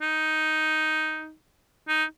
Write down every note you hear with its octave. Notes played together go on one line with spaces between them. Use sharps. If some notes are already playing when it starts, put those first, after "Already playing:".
D#4
D#4